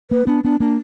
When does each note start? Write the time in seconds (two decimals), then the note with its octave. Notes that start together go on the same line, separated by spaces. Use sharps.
0.11 A#3 B4
0.27 B3 D4
0.44 B3 D4
0.60 A#3 D4